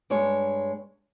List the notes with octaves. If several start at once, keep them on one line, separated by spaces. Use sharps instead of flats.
G2 G#3 C#5